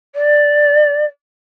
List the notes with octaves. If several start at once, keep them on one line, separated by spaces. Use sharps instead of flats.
D5